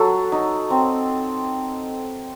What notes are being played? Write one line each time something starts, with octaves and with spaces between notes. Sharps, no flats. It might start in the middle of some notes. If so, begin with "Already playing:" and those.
Already playing: F#3 A4
D#4
C4